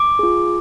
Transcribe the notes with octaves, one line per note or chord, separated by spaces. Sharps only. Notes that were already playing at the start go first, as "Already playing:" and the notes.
Already playing: D6
F4 G#4